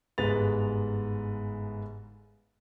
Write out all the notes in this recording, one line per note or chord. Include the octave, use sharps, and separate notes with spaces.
G1 G#2 G#4 B4 A6 F7